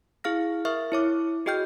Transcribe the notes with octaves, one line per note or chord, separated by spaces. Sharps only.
E4 G#4 F5 F6 A#6
A#4 E5 C#6 F6
E4 C#5 D6
F#4 G#4 D#5 G5 F6 G6